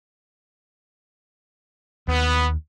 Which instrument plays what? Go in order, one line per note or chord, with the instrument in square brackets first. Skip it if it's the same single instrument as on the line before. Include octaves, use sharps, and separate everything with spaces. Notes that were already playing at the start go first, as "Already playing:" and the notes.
[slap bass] D#2 [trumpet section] B3